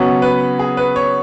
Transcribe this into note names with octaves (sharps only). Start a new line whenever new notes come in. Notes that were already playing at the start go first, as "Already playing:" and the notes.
Already playing: C#3 F#3 B3 C#5
B4
G#4
B4
C#5